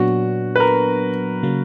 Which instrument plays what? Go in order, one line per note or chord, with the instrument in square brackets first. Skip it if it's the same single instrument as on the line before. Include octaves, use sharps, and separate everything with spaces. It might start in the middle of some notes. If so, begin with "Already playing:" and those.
Already playing: [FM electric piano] A#2 F#3 B3 D4 [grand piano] F#4
[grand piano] B4
A#4
[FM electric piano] C#3 F#3 A#3